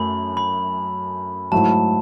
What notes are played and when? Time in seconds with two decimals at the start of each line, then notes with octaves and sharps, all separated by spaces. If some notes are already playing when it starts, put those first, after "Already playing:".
Already playing: F#2 A3 B5
0.37 B5
1.52 G#2 F#3 A3 E4 A5